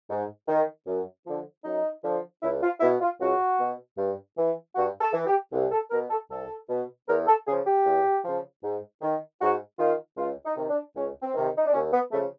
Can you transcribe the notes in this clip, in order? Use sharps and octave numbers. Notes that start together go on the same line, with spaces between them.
G#2
D#3
F#2
D3 F3
F#2 D#4
D3 F3
C#2 E4
F4
B2 E4
F4
C#2 F#4
B2
G2
E3
G2 F#4
A4
E3
G4
C2
A4
B2 A#4
A4
C2 A4
B2
E2 A#4
A4
C#3 F3 G#4
G4
E2
C#3 F3
G#2
D#3
G#2 F#4
D#3 F4
C#2 F4
D#4
C3 D#3
D4
C#2 C#4
C4
C3 D#3
D#4
D4
D#2 C#4
B3
C#3 F3 A3